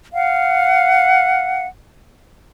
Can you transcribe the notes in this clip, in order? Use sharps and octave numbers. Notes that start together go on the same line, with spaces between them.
F5 F#5